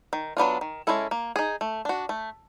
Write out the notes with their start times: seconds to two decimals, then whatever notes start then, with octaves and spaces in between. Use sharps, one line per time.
0.13 D#3
0.37 F#3 B3 D4 F4
0.61 D#3
0.87 G#3 C#4 E4 A4
1.11 A#3
1.36 D#4 G#4
1.61 A3
1.85 D4 F#4
2.09 A3